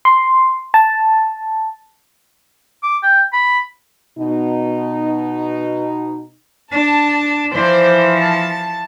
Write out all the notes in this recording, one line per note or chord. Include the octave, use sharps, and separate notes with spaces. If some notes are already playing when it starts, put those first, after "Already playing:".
C6
A5
D6
G5
B5
B2 D#4
D4 A5
E3 F3 C5 D5
A5